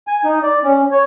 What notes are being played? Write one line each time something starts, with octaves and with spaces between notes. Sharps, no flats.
G#5
D#4
D5
C#4
C#5